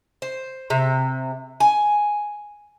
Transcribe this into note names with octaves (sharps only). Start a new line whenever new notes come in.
C5
C3
G#5